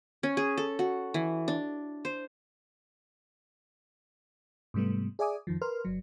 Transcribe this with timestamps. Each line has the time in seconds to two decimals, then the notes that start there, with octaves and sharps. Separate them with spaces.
0.23 C#4
0.37 G#4
0.58 A4
0.79 F#4
1.14 E3
1.48 D4
2.05 C5
4.74 G#2 C3 G3 A3 B3
5.19 G#4 D5 E5 G#5 D6 D#6
5.47 F2 D#3 F3
5.62 A#4 B4 C6 F6
5.85 G1 F#3